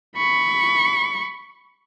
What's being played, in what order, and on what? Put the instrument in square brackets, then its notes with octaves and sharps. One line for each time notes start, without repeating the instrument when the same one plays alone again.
[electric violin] B5 C#6